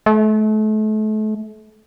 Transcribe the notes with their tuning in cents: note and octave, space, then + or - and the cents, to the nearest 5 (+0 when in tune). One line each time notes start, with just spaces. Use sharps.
A3 -35